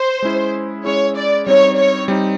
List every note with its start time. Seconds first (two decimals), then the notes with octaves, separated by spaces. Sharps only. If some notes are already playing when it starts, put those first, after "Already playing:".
Already playing: C5
0.22 G#3 C#4 E4 G#4
0.85 G#3 C#4 E4 G#4 C#5
1.16 D5
1.47 G3 C4 D#4 C#5
1.77 C#5
2.08 G3 C4 D#4